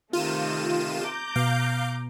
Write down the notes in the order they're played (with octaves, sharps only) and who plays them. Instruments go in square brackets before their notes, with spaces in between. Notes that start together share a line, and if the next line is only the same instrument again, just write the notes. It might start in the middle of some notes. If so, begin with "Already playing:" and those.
[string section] C3 D#3 A3 [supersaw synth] F4 D#7 E7
[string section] A#5 D6 G6
[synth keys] B2 [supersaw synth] F5